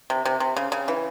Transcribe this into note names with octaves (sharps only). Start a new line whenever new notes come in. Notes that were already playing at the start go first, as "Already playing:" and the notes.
C3
C3
C3
C#3
C#3
E3